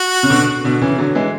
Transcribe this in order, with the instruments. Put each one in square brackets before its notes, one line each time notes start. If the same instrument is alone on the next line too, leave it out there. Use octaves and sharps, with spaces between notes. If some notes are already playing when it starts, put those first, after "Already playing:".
Already playing: [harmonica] F#4
[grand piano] C#3
B2 D3
B2 D3
C#3 E3
D3 F#3
E3 G#3